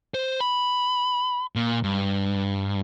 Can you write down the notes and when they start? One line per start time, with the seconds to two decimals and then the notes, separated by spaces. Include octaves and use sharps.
0.14 C5
0.41 B5
1.56 A#2
1.83 G2